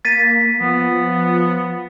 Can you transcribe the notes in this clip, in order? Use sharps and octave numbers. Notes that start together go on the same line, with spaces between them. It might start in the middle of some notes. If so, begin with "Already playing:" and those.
A#3 A6 B6 D#7
F3 B3